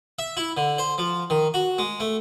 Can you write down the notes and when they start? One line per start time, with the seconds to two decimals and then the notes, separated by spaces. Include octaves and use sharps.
0.19 E5
0.37 E4
0.57 D3
0.78 C5
0.98 F3
1.30 D#3
1.54 F#4
1.78 G#3
2.00 A3